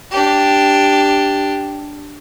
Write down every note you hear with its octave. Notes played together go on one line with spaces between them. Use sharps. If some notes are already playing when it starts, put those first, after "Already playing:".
D4 G4